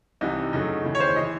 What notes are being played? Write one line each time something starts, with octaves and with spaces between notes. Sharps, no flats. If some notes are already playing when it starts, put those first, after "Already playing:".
C2 C3 E3 D#4
F#2 C#3 F#3 A3 D#4
D#2 C#3 E3
C#5
C5
E3 D#5